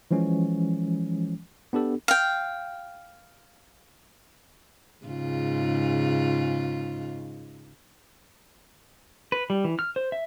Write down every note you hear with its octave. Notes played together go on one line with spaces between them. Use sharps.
E3 F3 G#3 C#4
B3 D4 G4 A4
F5 G5
G#2 C#3 F4
B4
G3
E3
F6
C5
E5